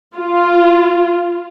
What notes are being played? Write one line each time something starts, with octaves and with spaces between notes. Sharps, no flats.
F4